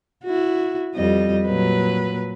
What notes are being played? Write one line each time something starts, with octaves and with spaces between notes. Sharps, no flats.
E4 F#4
F2 G3 D#5
A#2 F#3 B4